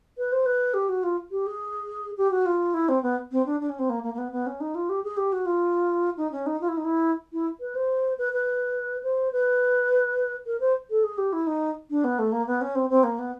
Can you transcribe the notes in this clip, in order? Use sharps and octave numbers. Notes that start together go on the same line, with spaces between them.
B4
C5
B4
G4
F#4
F4
G4
G#4
G4
F#4
F4
E4
C4
B3
C4
D4
D4
C#4
C4
A#3
A#3
A#3
B3
B3
C#4
D#4
F4
G4
G#4
G4
F#4
F4
D#4
C#4
D#4
F4
E4
D#4
E4
E4
B4
C5
B4
B4
C5
B4
A#4
C5
A4
G#4
G4
E4
D#4
D4
B3
A3
A#3
B3
C#4
C4
C4
A#3
B3